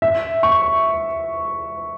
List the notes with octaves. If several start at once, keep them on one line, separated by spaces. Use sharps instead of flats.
E5
C#6